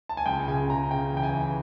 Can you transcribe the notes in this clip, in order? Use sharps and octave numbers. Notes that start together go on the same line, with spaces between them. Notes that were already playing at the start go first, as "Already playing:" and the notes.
A5
G#5
C#2 G5
C#3 G#5
C#3 A#5
C#3 G5
E3 G5
G#5
E3